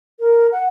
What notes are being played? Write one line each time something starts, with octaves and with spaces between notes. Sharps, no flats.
A#4
F#5